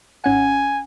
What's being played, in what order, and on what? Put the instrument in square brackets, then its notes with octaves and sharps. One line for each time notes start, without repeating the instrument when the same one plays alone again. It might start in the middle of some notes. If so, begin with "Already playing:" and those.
[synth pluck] G#1 C#4 F#5 [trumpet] G#5